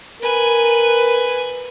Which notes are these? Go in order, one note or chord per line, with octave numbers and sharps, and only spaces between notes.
A#4 B4 G#5